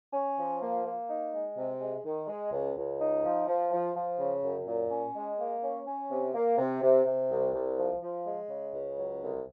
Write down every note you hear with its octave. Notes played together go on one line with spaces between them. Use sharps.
C#4
F3
A#3
A#3
D#4
G#3
C3
G#3
D#3
G#3
C#2
C#2
D#4
F3
F3
F3
F3
C#3
F#2
A#2
C#4
G#3
A#3
C#4
C#4
C3
A#3
C3
C3
C3
C2
C2
F3
F3
G#3
C#3
C#2
F#3
C2